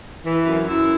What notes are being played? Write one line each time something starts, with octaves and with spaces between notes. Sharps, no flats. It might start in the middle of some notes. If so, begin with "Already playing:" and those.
E3
F#2
F#2 E4